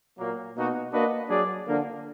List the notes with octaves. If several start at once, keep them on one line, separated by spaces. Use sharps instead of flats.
A#2 F#3 A#3
B2 A#3 D#4 F#4
A#3 D4 F#4 B4 D#5
F#3 D4 G#4 D5
D3 F3 A#3 D4